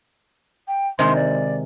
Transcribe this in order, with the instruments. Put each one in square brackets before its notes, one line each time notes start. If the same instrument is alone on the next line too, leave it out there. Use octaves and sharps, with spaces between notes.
[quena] G5
[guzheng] C3 D#3 G#3 [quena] C6
[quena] D5